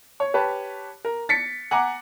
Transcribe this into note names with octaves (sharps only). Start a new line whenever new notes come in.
C#5
G4 B4 C#5 A5
A#4
A6 B6 C#7
F#5 G#5 A#5 D6